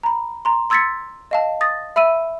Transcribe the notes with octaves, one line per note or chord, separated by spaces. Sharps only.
A#5 B5
A#5 C6
C6 E6 G#6 A6 B6 C#7
D#5 F5 A5
D#6 A6 A#6
E5 B5 E6 D#7